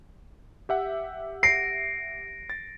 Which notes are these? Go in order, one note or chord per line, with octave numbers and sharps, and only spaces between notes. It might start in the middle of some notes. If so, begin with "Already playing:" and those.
G4 E5 F#5
A#6 C7 D7
A6